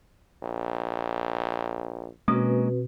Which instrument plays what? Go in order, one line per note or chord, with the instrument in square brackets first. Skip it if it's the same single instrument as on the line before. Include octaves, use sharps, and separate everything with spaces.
[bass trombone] A#1
[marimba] B2 [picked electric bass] G#3 A#3 C#4 [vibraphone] C4 F#4 B4